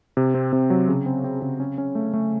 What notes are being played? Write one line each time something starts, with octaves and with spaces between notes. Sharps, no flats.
C3
C4
C3
F#3
C#3
C4
C4
C#3
C#4
C#4
A3
A3